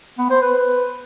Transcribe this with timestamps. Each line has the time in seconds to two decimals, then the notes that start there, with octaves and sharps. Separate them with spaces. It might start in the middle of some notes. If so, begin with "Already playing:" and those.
0.18 B3
0.30 C5
0.42 B4